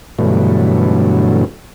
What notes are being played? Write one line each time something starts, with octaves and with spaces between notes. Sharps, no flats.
G2 B2 D3 E3 F#3 A3